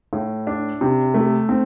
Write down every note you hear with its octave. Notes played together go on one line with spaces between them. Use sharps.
A2
D4
C3
A3
C4